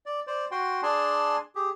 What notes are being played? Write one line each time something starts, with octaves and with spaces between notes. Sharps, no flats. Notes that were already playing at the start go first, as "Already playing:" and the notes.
D5
C5 D5
F#4 G5 C6
D4 G#4 D5 G#5 A5 C6
G4 G#4